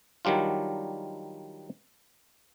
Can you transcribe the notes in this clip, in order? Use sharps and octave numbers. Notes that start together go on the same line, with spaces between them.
D#3 F#3 G3 D4 F4